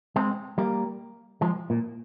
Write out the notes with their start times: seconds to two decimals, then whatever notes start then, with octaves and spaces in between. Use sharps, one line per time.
0.16 G#3 C4
0.58 G3 A#3
1.41 F3 G#3
1.70 A#2